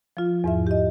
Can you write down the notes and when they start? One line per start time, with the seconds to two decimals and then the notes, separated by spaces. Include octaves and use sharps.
0.17 F3 F4
0.44 E2 G#2 E5
0.67 G4 D#5